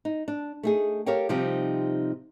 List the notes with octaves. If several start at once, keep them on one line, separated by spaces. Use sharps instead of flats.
D#4
D4
A3 D#4 G#4
G4 A4 A#4 C#5 F5 G5
C3 F3 G3 C4 D#4 G4